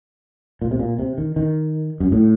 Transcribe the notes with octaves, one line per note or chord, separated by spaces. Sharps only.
A#2
C3
A#2
C3
D#3
D#3
F#2
A2